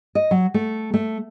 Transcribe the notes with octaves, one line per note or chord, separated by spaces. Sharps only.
D#5
F#3
A3
A3